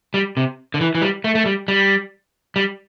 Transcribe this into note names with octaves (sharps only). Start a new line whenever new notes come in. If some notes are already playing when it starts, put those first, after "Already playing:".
G3
C3
D3
E3
E3
G3
A3
A3
G3
G3
G3